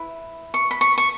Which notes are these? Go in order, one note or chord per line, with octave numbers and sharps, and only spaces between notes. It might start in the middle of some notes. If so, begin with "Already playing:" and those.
Already playing: E4 B4
C#6
B5
C#6
C#6